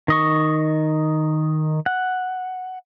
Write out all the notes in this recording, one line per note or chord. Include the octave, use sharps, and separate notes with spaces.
D#3 D#5 C#6
F#5